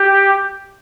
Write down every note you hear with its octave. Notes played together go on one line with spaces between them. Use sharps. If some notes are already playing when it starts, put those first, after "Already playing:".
Already playing: G4